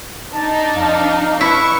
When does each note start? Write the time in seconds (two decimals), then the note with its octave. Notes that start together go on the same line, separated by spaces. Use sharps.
0.33 D4 D#4 A5
0.76 F2 F5
1.41 E4 B4 C#6